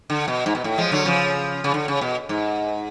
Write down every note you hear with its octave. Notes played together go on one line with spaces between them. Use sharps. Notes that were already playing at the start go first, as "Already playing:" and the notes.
D3
B2
G#2
B2
A2
F3 G#3
D3 F#3
C#3 F3
C#3
D3
C#3
B2
G#2